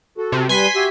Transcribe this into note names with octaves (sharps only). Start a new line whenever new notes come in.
F#4 A4
C3
G3 B4 G#5 C6 B6
F#4 G4 E5